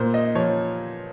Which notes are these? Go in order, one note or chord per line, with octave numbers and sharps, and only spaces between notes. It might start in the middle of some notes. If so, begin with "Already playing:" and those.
Already playing: A#2 C5
D#5
F3 C#5